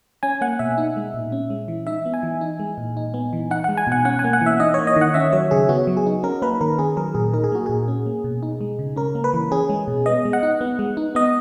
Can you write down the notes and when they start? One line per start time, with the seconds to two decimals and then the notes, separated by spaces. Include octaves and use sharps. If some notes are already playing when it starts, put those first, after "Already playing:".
0.23 C#4 G#5
0.41 A#3 F#5
0.59 B2 E5
0.78 D#4
0.96 G#3
1.14 A#2
1.32 C#4
1.50 G#3
1.68 E3
1.87 D#4 E5
2.06 B3
2.14 G#5
2.23 E3
2.41 D#4
2.59 G#3
2.78 A#2
2.97 D#4
3.14 B3
3.33 E3
3.51 D#4 F#5
3.64 G#3 F#5
3.77 G#5
3.87 B2 F#5
4.05 C#4 F#5
4.19 G#5
4.24 A#3
4.33 F#5
4.41 E3
4.46 E5
4.60 D#4 D#5
4.74 A#3 C#5
4.87 D#5
4.96 D#3
5.01 F#5
5.14 C#4 E5
5.33 F#3 C#5
5.51 C#3 G#4
5.69 B3 F#4
5.87 F#3
5.97 G#4
6.06 D#4
6.23 C#4 A#4
6.42 A#3 B4
6.61 D#3 A#4
6.79 C#4 G#4
6.97 F#3 A#4
7.15 A#2 G#4
7.34 D#4 A#4
7.44 G#4
7.52 A#3 F#4
7.66 A#2 G#4
7.88 C#4
8.06 A#3
8.24 B2
8.43 D#4
8.61 G#3
8.79 C#3
8.96 C#4 A#4
9.15 A#3
9.24 B4
9.34 E3
9.52 C#4 G#4
9.69 G#3
9.88 B2
10.06 B3 D#5
10.25 G#3
10.33 F#5
10.43 D#4
10.61 B3
10.79 G#3
10.97 D#4
11.15 B3 D#5